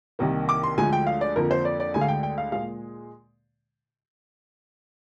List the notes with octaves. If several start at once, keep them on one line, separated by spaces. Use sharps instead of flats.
C2 C3 D#3 A#3
D6
C6
D2 D3 F3 G#3 G#5
G5
F5
D5
F2 D3 F3 A#3 A#4
C5
D5
D5
D2 D3 G#3 G#5
F5
G5
G5
F5
A#2 G#3 F5